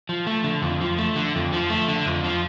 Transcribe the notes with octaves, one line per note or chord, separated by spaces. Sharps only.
F3
A3
D3
F2
F3
A3
D3
F2
F3
A3
D3
F2
F3